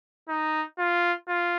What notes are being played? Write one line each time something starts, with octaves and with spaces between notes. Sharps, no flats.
D#4
F4
F4